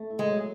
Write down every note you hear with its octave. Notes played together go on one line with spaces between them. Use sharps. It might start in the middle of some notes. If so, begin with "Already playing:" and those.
Already playing: A3
E4
G#3
F#3